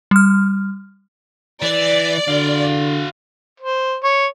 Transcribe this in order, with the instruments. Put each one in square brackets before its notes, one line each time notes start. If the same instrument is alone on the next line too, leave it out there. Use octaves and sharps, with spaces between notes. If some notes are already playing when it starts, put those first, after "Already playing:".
[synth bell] G3 F6
[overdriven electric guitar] E3 [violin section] D5
[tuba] D3 [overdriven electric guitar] F#4 F5
[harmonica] C5
C#5